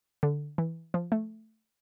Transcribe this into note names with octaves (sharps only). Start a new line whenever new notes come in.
D3
E3
F3
A3